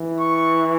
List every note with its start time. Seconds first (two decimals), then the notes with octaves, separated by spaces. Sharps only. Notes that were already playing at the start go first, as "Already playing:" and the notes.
Already playing: E3
0.20 C#6